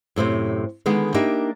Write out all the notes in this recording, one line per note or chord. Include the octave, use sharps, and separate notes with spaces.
F#2 A2 C3 C5
D3 D#3 G#3 B3 D#4
A#3 D4 D#4 G4 E5